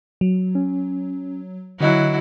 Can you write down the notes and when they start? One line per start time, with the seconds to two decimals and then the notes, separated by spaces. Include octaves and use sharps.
0.21 F#3
0.55 C#4
1.80 D3 F#3 E4 F#4 D#5 F#6